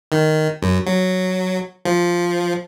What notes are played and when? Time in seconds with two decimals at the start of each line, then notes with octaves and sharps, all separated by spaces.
0.12 D#3
0.62 F#2
0.86 F#3
1.85 F3